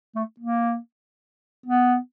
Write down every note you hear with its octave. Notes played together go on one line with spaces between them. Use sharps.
A3
A#3
B3